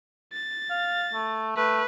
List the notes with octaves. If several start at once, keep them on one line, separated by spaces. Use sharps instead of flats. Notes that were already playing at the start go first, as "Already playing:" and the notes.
A6
F5
A3
A3 B4